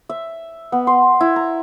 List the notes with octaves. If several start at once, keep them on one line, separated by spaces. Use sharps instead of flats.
E5
B3
C6
E4
A#5